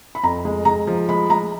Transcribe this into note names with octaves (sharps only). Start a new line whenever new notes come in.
B5
F2 A#5
G#3
G#3 A#5
F3
G#3 B5
G#3 A#5